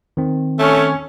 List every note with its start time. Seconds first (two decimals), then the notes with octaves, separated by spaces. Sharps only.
0.17 D#3 C4
0.59 A3 C#4